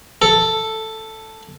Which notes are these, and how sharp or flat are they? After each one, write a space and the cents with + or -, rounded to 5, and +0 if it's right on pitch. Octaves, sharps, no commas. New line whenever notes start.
A4 +5